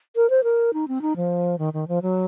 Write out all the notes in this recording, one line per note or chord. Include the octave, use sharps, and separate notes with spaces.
A#4
C5
A#4
D#4
C4
D#4
F3
D#3
D#3
F3
F#3